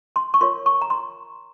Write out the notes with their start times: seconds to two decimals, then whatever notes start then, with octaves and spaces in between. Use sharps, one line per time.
0.16 C6
0.34 C#6
0.41 F4 A#4 C#5 C6
0.66 C#6
0.82 A#5
0.90 C6